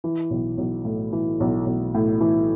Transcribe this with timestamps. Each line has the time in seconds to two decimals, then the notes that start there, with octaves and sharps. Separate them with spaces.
0.04 E3
0.30 B1
0.58 B1
0.85 A2
1.13 E3
1.40 B1
1.66 B1
1.95 A2
2.21 E3